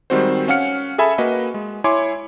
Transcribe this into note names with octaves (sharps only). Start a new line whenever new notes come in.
D#3 G3 G#3 C4 F#4 C5
C#4 F5 F#5 F6 C#7
G#4 A4 E5 G#5 B5
A#3 F#4 B4 D#5
G#3
E4 C#5 G#5 C6 D6